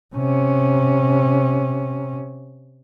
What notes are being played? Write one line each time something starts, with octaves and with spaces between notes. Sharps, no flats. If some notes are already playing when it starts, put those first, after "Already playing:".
C3 C#4